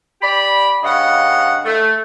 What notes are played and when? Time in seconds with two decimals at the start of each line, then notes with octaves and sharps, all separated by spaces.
0.22 G4 D5 B5
0.83 G2 C#3 D#5 F5 F#5
1.65 A3